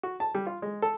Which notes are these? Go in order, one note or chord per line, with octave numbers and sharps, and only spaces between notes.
F#4
A5
G3
F4
G#3
A4